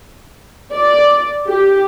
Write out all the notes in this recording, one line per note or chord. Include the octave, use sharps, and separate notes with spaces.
D5
G4